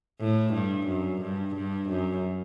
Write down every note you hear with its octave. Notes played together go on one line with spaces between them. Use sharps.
A2
G2
F#2
G2
G2
F#2